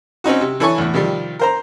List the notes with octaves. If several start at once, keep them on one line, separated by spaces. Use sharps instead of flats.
C4 C#4 D#4 F#4
C3
E3 E4 A4 C#5 G#5 C#6
E2 A2
C3 D#3 F3 G3
A#4 C5 A#5